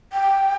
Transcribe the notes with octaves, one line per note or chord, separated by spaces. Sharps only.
G5